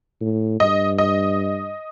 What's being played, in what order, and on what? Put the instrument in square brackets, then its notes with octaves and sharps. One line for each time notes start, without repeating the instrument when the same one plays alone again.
[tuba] A2
[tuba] G2 [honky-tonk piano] D#5
[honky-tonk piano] D#5